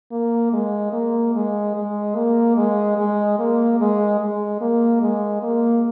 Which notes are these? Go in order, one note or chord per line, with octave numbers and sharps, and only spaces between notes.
A#3
G#3
A#3
G#3
G#3
A#3
G#3
G#3
A#3
G#3
G#3
A#3
G#3
A#3